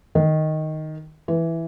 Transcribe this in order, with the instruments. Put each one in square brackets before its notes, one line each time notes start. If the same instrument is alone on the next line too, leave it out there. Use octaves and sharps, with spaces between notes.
[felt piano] D#3
E3